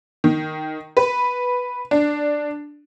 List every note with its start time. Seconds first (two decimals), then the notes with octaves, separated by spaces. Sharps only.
0.24 D#3
0.97 B4
1.91 D4